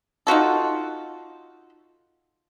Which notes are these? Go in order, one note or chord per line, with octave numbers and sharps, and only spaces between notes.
D#4 F4 F#4 A4